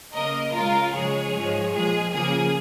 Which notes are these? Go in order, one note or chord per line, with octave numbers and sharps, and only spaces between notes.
C#3 A#3 A#4 D#5
C#3 G#3 F4 A#4
C#3 F3 G#3 G#4 C#5
G#2 F3 G#3
A#2 F3 G#3 G#4
C#3 F3 A#3 G#4